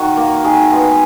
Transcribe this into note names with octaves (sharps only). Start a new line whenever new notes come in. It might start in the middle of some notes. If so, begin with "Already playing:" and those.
Already playing: D#3 F#4
A#3
D#3 G#4
G#3 B3